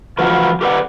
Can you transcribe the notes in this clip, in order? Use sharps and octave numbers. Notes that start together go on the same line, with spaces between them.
E3 F3 A3 B3 F4 F#4
G4 A4 B4 C5 D5 F#5